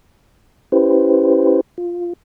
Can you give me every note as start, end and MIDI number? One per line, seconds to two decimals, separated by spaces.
0.72 1.61 61
0.72 1.61 64
0.72 1.61 67
0.72 1.61 71
0.72 1.61 72
1.78 2.13 65